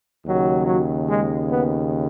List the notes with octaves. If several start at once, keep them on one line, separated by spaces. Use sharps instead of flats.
D#2 C#3 F#3
F#3
G#3
B3